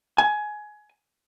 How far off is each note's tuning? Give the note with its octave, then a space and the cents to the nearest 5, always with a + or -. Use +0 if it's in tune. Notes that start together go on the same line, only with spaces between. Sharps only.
G#5 +20